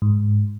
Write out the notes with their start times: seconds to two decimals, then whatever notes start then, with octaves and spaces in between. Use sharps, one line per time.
0.02 G#2